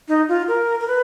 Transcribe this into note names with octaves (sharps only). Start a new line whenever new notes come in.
D#4
F4
A#4
A#4
B4